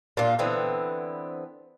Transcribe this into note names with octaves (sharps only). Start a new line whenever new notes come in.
A#2 D4 F4
D3 E3 B3 C4